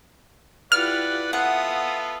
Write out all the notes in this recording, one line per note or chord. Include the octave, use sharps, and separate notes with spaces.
E4 F4 G4 B4 D5 F#5 F6
B3 F4 A4 E5 F#5 D#6